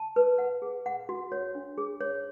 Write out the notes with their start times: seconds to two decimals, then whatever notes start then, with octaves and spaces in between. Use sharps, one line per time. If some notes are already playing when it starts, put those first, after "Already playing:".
Already playing: A5
0.16 B4
0.38 F#5
0.62 G#4
0.86 F#5
1.09 F#4
1.32 C#5
1.55 D4
1.78 G#4
2.01 C#5